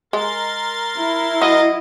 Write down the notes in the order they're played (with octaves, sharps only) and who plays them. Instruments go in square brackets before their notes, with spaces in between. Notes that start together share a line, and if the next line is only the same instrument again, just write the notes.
[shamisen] G#3 [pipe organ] A#4 C6 A6
[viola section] E4
[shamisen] F#3 [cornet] D#5